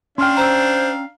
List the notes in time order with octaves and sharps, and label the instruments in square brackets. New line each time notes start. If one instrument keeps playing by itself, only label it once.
[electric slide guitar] C#4 G5 [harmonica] D4 F5 [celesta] C6 F6
[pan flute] C5 [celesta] A#5 E6